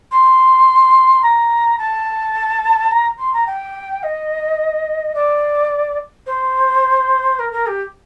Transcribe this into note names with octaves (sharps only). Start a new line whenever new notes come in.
C6
A#5
A5
A#5
C6
A#5
G5
D#5
D5
C5
A#4
A#4
G4